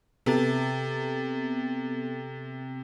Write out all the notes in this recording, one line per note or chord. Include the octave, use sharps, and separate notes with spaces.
C3 B3 A4 A6